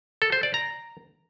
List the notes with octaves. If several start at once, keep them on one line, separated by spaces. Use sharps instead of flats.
A4
C5
D5
A#5